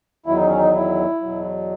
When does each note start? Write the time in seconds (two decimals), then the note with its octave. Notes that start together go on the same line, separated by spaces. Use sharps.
0.26 E2 D#3 F#3 E4
0.36 D#4
0.46 C#4
0.57 D#4
0.74 E4
1.21 E2 B2 F#3